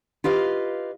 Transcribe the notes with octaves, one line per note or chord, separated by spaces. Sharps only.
F4 G4 B4 D#5 F5